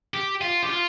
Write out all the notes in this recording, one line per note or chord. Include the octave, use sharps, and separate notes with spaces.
G4
F4
G4
F4